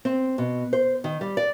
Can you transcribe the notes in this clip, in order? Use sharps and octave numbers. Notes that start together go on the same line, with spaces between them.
C4
B2
C5
D#3
G3
D5